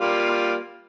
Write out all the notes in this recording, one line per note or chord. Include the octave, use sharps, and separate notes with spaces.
G3 A#3 F4